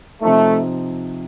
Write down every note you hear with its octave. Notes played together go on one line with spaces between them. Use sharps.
C3 F3 A3 C4 D#4